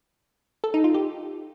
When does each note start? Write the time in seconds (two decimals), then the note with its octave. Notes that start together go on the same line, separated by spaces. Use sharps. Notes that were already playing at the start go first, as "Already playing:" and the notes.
0.64 A4
0.74 D#4
0.84 F4
0.94 G4